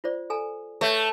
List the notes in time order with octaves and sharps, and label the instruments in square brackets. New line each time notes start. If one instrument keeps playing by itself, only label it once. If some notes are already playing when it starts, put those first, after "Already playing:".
[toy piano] F4 C5 D5
A4 G#5 A#5
[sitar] A3 [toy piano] B4 C#5 E5